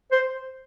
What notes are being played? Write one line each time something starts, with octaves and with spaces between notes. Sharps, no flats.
C5